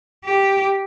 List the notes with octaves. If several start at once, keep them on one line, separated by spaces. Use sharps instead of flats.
G4